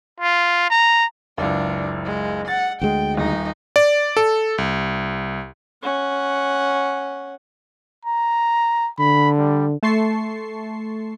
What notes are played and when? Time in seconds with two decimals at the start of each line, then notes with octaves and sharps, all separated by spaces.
0.20 F4
0.70 A#5
1.38 F#1 C#2 D4
2.05 G#3
2.48 F#5 A6
2.81 D2 G#3 G5
3.17 D#1 D#4
3.76 D5
4.17 A4
4.58 C2
5.82 C#4 F#5
8.05 A#5
8.99 D3 B5
9.38 G3
9.83 A3 A5 C6 C#6 C7